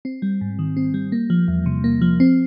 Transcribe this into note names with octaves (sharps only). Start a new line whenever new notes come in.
C4
G3
G#2
D#3
C4
G3
A#3
F3
E2
C3
A#3
F3
C4